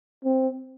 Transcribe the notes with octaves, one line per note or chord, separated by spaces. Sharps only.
C4